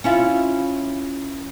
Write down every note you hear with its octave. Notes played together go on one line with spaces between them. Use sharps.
C#4 E4 F4